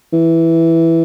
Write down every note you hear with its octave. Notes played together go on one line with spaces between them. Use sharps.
E3